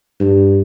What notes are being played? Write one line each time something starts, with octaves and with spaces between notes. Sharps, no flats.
G2